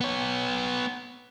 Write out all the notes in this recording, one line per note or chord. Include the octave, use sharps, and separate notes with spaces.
B3 C#5